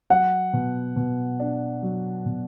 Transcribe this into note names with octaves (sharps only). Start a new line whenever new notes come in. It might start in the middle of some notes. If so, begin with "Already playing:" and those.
F#3 F#5
B2
B2
D4
F#3
B2